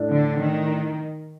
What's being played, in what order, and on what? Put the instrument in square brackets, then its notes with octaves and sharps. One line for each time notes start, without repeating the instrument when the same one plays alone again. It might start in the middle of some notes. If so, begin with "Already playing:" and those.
Already playing: [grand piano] A2 A3 D4
[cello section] D3
D#3